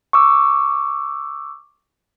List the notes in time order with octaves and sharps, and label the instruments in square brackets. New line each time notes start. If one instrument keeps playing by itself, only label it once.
[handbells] C#6 D6 E6